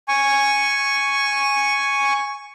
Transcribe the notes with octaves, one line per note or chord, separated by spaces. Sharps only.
G#5 C#6